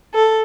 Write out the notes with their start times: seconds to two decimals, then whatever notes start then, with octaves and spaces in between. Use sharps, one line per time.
0.14 A4